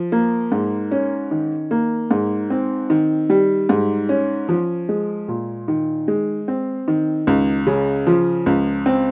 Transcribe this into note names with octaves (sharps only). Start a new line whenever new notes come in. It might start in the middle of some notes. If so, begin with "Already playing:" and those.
Already playing: F3
A#3
G#2
C#4
D#3
A#3
G#2
C4
D#3
G3
G#2
C#4
F3
G#3
A#2
D#3
G#3
C4
D#3
C#2
C#3
F3
C#2
C4